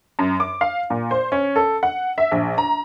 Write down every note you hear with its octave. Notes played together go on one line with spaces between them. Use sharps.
F#2
D6
F5
A#2
C5
C#4
A4
F#5
E5
A#1
A#5